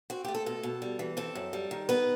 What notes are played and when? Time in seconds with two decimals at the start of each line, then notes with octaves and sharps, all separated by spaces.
0.10 C4 F#4
0.25 A3 G4
0.35 A4
0.46 B2 A4
0.63 B2
0.82 G3
0.99 E3
1.17 C4 A4
1.35 F#2
1.53 G3
1.71 D#3
1.89 B3 B4